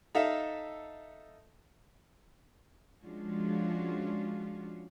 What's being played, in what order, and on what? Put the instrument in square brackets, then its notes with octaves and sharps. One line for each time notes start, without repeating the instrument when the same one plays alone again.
[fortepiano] D#4 A4 E5 F5
[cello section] F3 G#3 C#4 D4 F4 F#4